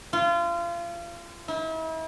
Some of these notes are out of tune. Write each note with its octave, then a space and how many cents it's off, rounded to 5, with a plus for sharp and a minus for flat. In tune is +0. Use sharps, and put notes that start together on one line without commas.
F4 -30
E4 -40